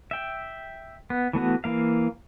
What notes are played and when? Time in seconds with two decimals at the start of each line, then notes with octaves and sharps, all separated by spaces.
0.11 E5 G5
1.10 B3
1.33 E3 A3 B3 F#4
1.64 E3 A#3 F5